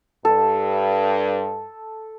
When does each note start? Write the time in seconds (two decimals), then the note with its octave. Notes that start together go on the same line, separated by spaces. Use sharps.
0.25 G2 A4